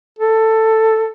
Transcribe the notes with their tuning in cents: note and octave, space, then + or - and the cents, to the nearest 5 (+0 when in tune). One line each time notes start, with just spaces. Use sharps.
A4 +10